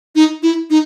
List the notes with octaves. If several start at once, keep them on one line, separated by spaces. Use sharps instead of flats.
D#4
E4
D#4